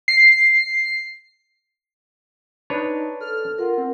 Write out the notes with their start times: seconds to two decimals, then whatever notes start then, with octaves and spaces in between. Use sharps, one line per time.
0.08 C7
2.70 D4 D#4 B4 C#5
3.21 A4 F6
3.58 F4 A#4 F#5
3.78 C4